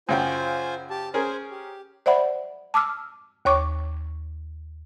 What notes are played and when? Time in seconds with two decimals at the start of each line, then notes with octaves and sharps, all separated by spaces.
0.09 F#2 C#3 F4 C5 G5 G#5
0.90 G4 A5
1.14 C#4 G#4 A#4 C5 G#5
1.51 G4
2.06 C5 D5 E5 F#5 B5
2.74 A5 D6 E6 F6
3.45 D#2 C#5 C#6 D6